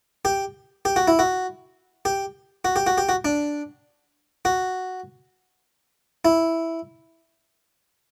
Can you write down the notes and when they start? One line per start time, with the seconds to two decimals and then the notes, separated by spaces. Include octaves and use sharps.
0.25 G4
0.85 G4
0.96 F#4
1.08 E4
1.19 F#4
2.05 G4
2.65 F#4
2.76 G4
2.87 F#4
2.98 G4
3.09 F#4
3.25 D4
4.45 F#4
6.25 E4